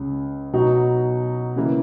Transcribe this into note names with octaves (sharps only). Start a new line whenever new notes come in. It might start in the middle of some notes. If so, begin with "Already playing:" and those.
Already playing: C#2 C#3 G#3
B2 F#3 B3 D#4 F#4
C#3 E3 A#3